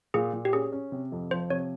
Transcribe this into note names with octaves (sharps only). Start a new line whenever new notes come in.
A#2 G#4
A#2
G4
C#4 G#4
C#4
C3
F2
F3 C5
C3 C#5